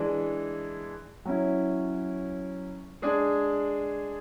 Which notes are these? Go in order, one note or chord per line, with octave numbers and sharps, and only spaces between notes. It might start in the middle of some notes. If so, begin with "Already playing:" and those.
Already playing: E3 G#3 D4
F#3 C#4 E4
G#3 D4 G#4